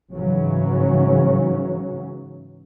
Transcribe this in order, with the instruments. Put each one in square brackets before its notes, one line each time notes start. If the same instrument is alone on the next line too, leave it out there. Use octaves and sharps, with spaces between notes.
[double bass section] G#2 C#3 E3 F#3 C#4